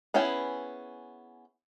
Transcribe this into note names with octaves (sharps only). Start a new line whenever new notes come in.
B3 C#4 E4 G#4 G5